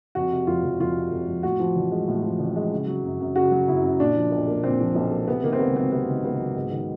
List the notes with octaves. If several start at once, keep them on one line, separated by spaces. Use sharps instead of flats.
F2 F#4
C3
F1 F4
F1
F2 F4
C3
F1
F1
A2 F#4
F3
A1
G#3
A2
F3
A1
G#3
C#3
F#3
F#2
F#2
C#3 F#4
F#3
F#2 E4
F#2
A#2 D4
F3
B1
A#3
A#2 C4
F3
B1
A#3
C3 B3
D#3 A#3
C4
C#2 B3
F#3 C4
C3 B3
D#3
C#2 B3
F#3
G#2
D#3